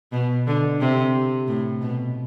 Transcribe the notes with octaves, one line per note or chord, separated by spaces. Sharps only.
B2
D3
C3
A2
B2